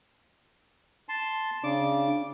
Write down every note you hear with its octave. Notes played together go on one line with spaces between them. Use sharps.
A5 C6
C#3 D4 D6